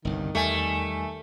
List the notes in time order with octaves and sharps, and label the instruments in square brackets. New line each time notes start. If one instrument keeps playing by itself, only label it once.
[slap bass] G1 C2 G2 [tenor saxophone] D#3
[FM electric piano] E2 G#5 [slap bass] G3 [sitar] A3